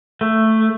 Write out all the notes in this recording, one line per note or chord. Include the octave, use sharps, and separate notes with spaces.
A3